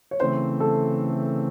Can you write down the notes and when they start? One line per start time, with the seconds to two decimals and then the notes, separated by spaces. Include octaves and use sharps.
0.11 C#5
0.20 C#3 E3 A3 C4 C5
0.60 A4